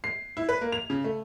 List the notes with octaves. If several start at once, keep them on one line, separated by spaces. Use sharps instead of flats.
C7
E4
B4
A#3
F7
C#3
A3